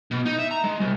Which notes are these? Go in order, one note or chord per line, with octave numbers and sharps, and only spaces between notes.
B2
D#4
E5
A#5
G#3
C2